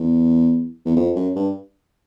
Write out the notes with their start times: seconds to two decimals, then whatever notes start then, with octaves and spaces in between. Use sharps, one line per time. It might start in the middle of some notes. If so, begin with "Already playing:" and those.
Already playing: E2
0.85 E2
0.97 F2
1.16 F#2
1.36 G2